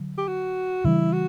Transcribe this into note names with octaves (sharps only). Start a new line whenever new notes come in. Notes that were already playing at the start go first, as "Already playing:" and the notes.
Already playing: D3 F#3
G4
F#4
C#3 E3 G3 D4 E4
F#4